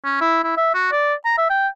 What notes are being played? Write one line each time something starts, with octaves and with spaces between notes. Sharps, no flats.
C#4
E4
E4
E5
F#4
D5
A#5
E5
G5